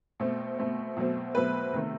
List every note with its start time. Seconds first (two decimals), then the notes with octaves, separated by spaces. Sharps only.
0.20 B2 A3 C4
0.58 B2 A3 C4
0.97 B2 F#3 A3 C4
1.35 B2 F#3 A3 C4 B4
1.73 C3 D#3 A3